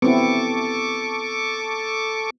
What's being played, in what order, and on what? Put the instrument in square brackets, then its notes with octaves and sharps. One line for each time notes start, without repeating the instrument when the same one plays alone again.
[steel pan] B3 C4 E4 [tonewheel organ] A4 C#6 D6